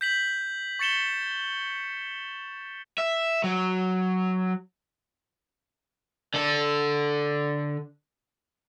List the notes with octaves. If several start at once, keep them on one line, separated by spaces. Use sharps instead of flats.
G6 B6 F#7
C#6 A6 C#7 E7 G7
E5
F#3
D3 A4